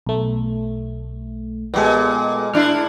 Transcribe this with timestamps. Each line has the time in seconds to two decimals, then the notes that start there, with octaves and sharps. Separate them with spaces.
0.07 B1 A3
1.74 A#2 G#3 B3 G4 A4
2.54 A2 D4 E4 F6